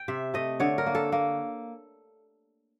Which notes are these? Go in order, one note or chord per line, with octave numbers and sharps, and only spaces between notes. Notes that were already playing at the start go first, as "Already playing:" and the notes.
Already playing: G5
C3 E5
A3 D#5
D3 C#5
A#4
A#3
A4
A#3